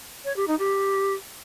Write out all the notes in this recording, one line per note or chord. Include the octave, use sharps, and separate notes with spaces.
C#5
G4
D#4
G4